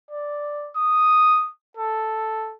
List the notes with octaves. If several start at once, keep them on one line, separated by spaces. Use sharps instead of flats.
D5
D#6
A4